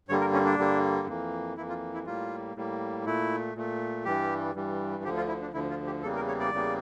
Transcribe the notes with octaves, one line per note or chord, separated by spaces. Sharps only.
G2 D3 G3 A#3 C#5
A#4
C#4
D4
G2 D3 G3 A#3
F2 E3 A#3
F2 E3 A#3 E4
F4
E4
A2 G3 A#3 F4
A2 G3 A#3
A#2 A3 E4
A#2 A3
G2 E3 G3 G4
G2 E3 G3
D2 D3 F3 G4
F4
E4
D4
D2 D3 F3 E4
F4
G4
E2 C#3 E3 G3 A#3 A4
A#4
C#5
D5
E2 C#3 E3 G3 A#3